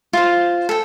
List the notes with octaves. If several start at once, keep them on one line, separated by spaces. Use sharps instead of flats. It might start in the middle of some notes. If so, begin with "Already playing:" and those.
F4 C5
A4 G5